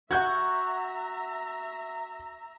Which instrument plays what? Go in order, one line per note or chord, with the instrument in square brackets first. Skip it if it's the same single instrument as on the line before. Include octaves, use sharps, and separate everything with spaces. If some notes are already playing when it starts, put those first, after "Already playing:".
[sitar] F#4 [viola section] E5 A#5 [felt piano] F#5 G6 G#6